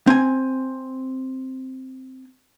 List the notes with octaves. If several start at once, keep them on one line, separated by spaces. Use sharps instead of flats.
C4 G#5